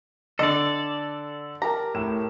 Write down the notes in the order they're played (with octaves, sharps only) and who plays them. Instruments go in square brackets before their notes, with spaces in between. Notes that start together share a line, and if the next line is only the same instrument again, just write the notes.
[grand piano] D3 [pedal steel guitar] A4 D5 [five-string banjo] D#5
[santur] G4 A#4 A5 [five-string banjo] A#5
[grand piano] A2 E7